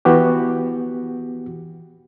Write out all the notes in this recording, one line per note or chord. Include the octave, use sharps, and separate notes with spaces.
E3 B3 F#4 G4